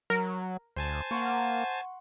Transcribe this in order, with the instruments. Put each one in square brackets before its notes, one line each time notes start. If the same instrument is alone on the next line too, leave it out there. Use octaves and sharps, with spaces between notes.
[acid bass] F#3 [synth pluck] A#4
[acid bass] D2 [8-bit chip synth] C5 G#5 A5
[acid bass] A#3 [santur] F#5 C6 C#6